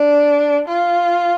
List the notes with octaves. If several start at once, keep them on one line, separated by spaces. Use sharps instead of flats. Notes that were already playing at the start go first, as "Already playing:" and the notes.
Already playing: D4
F4